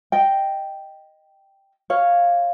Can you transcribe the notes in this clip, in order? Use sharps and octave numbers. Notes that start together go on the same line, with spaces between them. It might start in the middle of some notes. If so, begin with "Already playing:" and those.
D#5 G5
C#5 F5